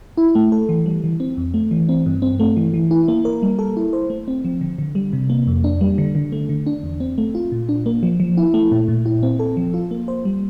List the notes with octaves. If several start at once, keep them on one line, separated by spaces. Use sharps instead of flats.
E4
A3
A4
E3
G3
E3
C4
F2
A3
E3
C4
G2
C4
A3
E3
E3
E4
A#3
A#4
G3
A4
E4
C5
A3
C4
F3
D3
D3
G3
C3
A#3
F2
D4
G3
D3
D3
A3
D3
D4
E2
C4
A3
F4
A#2
D4
A#3
F3
F3
E4
A3
A#2
A#2
E4
C4
A4
F3
F4
A#3
C5
G3